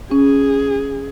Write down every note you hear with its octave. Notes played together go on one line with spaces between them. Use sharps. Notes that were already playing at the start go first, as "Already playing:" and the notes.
C#4 G#4